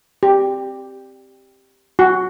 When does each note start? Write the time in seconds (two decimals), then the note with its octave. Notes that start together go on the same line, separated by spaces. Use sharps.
0.23 G4
1.99 F#4